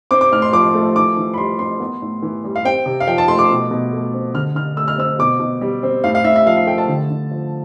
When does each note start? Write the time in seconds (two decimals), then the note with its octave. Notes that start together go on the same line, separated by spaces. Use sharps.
0.11 C4 D6
0.21 D6
0.32 A2 F6
0.42 C6
0.53 F3 D6
0.74 A3
0.96 E3 D6
1.17 E3
1.34 B5
1.38 G3 C6
1.59 C4 C6
1.80 B3
2.02 A2
2.22 E3
2.44 G3
2.56 F5
2.65 C4 G5
2.86 C3
3.00 F5
3.07 F3 G5
3.18 A5
3.28 A3 C6
3.39 D6
3.50 B2
3.71 B2
3.93 A3
4.14 C4
4.34 D3 F6
4.55 D3 F6
4.77 A3 E6
4.88 F6
4.98 C4 E6
5.19 B2 D6
5.40 B2
5.61 G3
5.83 C4
6.04 A2 F5
6.15 F5
6.24 A2 E5
6.36 E5
6.46 F3 F5
6.57 F5
6.67 A3 G5
6.78 A5
6.88 D3
7.10 D3
7.31 F3